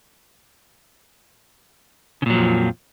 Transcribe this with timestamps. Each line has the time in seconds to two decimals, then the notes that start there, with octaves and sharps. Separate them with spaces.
2.22 C#3
2.26 A#2
2.30 F#3
2.34 F3
2.37 F2